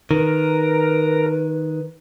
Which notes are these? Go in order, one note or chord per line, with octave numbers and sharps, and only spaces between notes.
D#3 A#4 B4